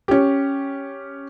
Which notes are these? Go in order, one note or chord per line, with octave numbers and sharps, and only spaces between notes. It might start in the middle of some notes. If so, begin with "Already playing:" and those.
C#4 G4